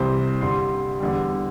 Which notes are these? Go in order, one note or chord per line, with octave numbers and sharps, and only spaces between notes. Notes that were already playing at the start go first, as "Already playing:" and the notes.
Already playing: C2 C3 E3 G3 C5
G2 D3 G3 C6
E2 D3 G3